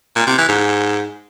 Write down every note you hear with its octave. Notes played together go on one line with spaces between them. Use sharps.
A#2
C3
E3
G#2